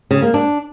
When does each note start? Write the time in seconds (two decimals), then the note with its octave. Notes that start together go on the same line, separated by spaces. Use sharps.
0.11 C#3
0.22 A#3
0.34 D4